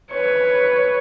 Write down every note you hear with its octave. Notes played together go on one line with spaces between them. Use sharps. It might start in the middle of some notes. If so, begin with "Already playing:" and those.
B4 C#5